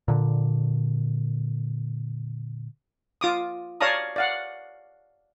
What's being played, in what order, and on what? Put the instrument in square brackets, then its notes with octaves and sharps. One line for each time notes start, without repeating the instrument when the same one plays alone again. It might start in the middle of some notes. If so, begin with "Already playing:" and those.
[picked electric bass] A#2 D3
[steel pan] F4 D6 D#6
C#5 D5 F5 A5 A#5 D#6
D5 F5 F#5